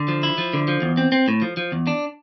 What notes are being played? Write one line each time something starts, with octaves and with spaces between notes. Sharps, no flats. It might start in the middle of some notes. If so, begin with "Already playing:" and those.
Already playing: D3
F3
E4
F3
D3
F3
E2
C4
C4
A2
F3
F3
E2
D4